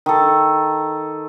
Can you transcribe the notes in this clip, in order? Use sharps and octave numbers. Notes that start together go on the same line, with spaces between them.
D#3 A4